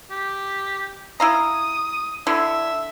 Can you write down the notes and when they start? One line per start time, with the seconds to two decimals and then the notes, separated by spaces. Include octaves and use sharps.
0.10 G4
1.20 E4 F5 A#5 D#6
2.27 D3 E4 E5